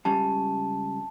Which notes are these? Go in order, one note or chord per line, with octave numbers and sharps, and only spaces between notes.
C#2 C#3 G3 A5